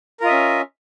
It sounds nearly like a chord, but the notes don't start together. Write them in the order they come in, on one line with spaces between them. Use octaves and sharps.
A#4 F4 D#5 E5 C#4